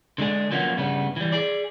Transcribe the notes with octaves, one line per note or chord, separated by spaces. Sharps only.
D3 G#3 D4 G#4
F3 F#3 A#3 B3 C#4
G2 C#3 G3 B3
E3 G3
G#4 D5